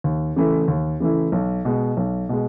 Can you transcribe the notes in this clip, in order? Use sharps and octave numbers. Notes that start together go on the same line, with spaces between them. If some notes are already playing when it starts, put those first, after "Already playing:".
D#2
C#3 E3 A3 E4
D#2
C#3 E3 A3 E4
B1
B2 G#3
B1
B2 G#3